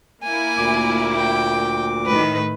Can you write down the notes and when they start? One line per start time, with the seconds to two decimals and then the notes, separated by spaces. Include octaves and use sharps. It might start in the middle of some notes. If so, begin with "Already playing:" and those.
0.23 A#3 E4 G#5
0.57 D2 A#2 D6
1.16 G5
2.06 A2 D#3 B4